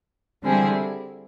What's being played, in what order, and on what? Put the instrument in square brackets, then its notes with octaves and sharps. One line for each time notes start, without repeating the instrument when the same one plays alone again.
[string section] D3 G3 C4 E4 G#4